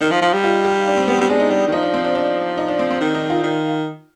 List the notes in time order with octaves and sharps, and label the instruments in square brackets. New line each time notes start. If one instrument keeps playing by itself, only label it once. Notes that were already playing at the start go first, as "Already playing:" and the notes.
[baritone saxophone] D#3 [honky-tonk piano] D#4
[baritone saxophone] F3
F3
G3
[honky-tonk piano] F4
G4
D4
C4
B3
C4
[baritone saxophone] G3
[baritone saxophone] G#3 [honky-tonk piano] D4
[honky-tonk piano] D#4
[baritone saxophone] G3 [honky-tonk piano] D4
[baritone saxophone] D#3
[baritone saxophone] F3 [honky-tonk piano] D#4
[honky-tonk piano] D4
C4
D4
D4
D#4
D4
C4
C4
[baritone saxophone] D#3
[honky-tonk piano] D#4
F4
[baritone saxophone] D#3